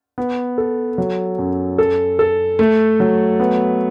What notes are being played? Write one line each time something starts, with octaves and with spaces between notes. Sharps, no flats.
B3
A4
F#3
F#2
A4
A4
A3
F#3
B3